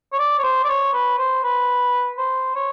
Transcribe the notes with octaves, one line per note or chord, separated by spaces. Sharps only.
C#5
D5
C#5
C5
D5
C#5
B4
C5
B4
C5
C#5